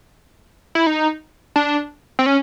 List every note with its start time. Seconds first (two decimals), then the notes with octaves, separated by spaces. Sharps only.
0.75 E4
0.87 D#4
1.56 D4
2.19 C4
2.26 C#4